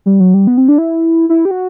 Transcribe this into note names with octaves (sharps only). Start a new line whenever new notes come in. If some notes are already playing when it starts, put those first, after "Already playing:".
G3
F#3
G3
B3
C4
D4
E4
E4
G4
F#4